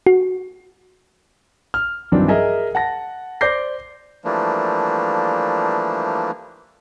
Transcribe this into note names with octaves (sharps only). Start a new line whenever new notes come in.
F#4
F6
G2 D#3 E3 F#3 C4 D4
G#4 A#4 D#5 E5 G#5
F#5 A5 A#6
C5 D5 D6 G6 A#6 C7
E3 F3 G3 A3 A#3 D4